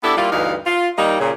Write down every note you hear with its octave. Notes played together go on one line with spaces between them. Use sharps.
B3 D4 E4 G4 A4
G3 A#3 E4 F4
D2 G2 E3 D#4 F5
F4
G3 A#3 D#4
A#2 C#3